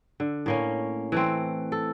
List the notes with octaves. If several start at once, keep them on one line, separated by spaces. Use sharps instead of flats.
D3
A2 A#3 C#4
E3 A3 C4
A4